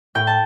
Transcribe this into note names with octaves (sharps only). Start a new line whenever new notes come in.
A2 G5
A5